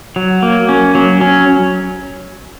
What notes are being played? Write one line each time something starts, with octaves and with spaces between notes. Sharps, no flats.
F#3
A#3
C#4
F#3
C#4